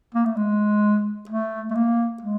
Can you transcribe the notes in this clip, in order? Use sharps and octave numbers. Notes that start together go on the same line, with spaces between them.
A#3
A3
G#3
A3
A3
A#3
G#3